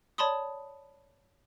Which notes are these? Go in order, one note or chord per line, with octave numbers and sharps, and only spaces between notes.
C#5 D5 A5 B5 C6 D#6